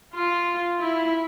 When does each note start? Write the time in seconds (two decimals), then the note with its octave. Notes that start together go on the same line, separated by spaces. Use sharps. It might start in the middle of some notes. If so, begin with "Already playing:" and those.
0.15 F4
0.79 E4